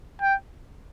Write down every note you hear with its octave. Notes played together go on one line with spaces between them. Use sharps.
G5